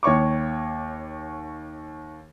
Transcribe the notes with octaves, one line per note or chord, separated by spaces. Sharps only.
D#2 C#5 C#6 D6